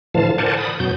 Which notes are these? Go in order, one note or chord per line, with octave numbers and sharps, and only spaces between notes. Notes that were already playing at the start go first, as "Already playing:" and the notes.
A2 D3 E3 F3 F5 A5
A#4 C5 D5 F#5 G#5 A5
B5 D#6
F#2 B2 F#3 G6